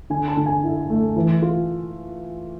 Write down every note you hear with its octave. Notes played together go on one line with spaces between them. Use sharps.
D3 G#5
A5
D3
G#5
E4
A3
E3
F4